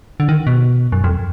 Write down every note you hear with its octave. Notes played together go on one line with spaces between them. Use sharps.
D3
D#3
B2
F#2
F2